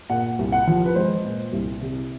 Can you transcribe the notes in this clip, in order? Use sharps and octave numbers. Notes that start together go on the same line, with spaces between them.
A#2 F#5
C2
F#5
F3
B4
G#3 C5
A#2
C2
C3